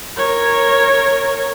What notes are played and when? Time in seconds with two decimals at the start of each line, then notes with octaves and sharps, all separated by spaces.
0.17 A#4 C#5